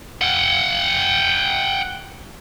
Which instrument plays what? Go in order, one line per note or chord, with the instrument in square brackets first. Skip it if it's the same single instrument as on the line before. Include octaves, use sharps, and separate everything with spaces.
[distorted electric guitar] F#5 G5